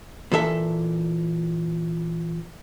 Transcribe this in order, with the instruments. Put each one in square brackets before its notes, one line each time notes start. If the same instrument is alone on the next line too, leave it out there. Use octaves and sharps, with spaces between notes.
[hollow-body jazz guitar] A#2 E3 A4 E5